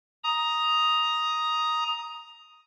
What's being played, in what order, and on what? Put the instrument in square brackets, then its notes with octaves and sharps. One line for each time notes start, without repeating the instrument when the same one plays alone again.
[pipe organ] A#5 D#6